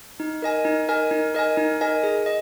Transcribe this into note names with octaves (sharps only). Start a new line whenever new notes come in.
D#4
A#4 D#5 G#5
D#4
A#4 D#5 G#5
D#4
A#4 D#5 G#5
D#4
A#4 D#5 G#5
G#4
D#5